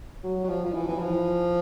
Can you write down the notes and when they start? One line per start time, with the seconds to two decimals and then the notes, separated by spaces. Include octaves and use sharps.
0.24 F#3
0.44 F#3
0.49 F3
0.65 F3
0.74 E3
0.88 E3
0.98 F3